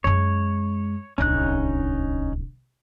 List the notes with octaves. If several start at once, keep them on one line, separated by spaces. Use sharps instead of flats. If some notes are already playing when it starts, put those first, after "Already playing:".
F#2 G#3 C#5
D1 C2 C#4 D#4 F#6